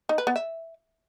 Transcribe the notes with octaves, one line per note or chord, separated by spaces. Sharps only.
D#4
B4
B3
E5